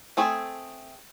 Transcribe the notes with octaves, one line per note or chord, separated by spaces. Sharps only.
A3 C4 G#4 A4